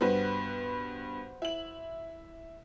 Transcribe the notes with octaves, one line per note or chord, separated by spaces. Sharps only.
G2 B3 F#4 B4 C5
E4 F#7